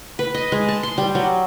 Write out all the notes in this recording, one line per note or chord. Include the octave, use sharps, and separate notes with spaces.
B4
D#5
G#3
A5
C6
G3
F#3